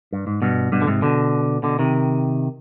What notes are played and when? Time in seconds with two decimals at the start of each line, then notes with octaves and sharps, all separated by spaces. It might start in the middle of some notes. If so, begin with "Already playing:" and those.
0.13 G2
0.27 G#2
0.42 G2 B2
0.72 G2 B2
0.82 D3
0.87 G#2 C3
1.02 B2 D3
1.63 B2 D3
1.79 C3 D#3